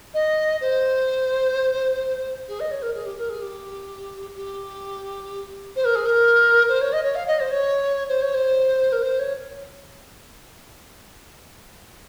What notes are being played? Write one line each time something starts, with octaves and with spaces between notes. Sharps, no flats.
D#5
C5
G#4
D#5
C#5
A#4
G#4
G4
A#4
G#4
G4
G4
C5
A#4
G#4
A#4
C5
C#5
D#5
C#5
F5
D#5
C5
C#5
C5
C#5
C5
A#4
C5
C#5